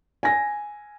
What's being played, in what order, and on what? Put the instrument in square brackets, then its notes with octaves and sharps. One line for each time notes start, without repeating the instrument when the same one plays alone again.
[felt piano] G#5 A#6